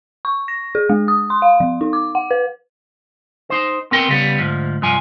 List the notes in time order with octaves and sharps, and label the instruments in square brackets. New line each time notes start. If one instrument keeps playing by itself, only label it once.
[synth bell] C#6
A#6
G#4
G#3
D#6
C6
F5
F3
D#4
D6
F#5
B4
[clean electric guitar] D#4 C5
B3 C4 A#4 G5
C#3 G3 B3
D2 G#2 F3
C2 G2 F3 G#5